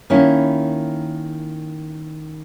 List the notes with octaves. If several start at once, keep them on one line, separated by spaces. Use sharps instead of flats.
D#3 A#3 C#4 E4